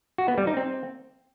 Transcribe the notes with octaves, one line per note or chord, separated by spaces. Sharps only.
F#4
B3
G3
D#4
C4